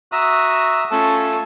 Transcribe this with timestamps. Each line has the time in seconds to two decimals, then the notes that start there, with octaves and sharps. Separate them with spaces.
0.12 F#4 E5 A#5 D#6 E6
0.91 A3 C#4 F4 A4 A5